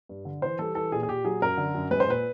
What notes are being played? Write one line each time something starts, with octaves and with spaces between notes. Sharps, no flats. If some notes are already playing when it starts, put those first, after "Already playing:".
G2
D3
E3 C5
G3 A4
E3 A4
A#2 G#4
G#4
A#2 G4
F#3 G#4
F#2 A#4
D3
F#2
G#3 B4
C5
A#2 B4